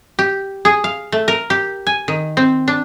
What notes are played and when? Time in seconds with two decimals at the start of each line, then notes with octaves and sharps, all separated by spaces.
0.19 G4
0.65 G#4
0.84 F5
1.12 A3
1.28 A#4
1.50 G4
1.87 G#5
2.08 D#3
2.37 C4
2.68 D4